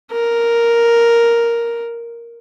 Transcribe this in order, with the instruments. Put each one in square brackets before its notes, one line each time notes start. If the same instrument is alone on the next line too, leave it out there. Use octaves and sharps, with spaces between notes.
[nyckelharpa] A#4